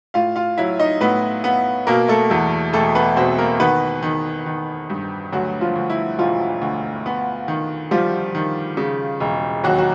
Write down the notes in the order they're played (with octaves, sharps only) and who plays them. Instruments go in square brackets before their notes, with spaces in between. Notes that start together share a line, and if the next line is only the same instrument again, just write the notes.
[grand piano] A2 F4 F5
F4 F5
F#3 E4 E5
D#4 D#5
A2 B3 B4
B3
B2 A#3 A#4
A3 A4
E2 A3 A4
E1 A3 A4
B3 B4
B2 C4 C5
A#3 A#4
D#3 B3 B4
D#3
D#3
G2
D2 F#3 F#4
F3 F4
D2
E4
E1 F3 F4
D2
B3
D#3
F3 G3 F4
D#3
C#3
E1
D#2 F#3 F#4
F#4